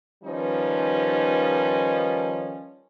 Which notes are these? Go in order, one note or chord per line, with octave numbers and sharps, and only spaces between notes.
D#3 F3 G3 C#4 D#4 B4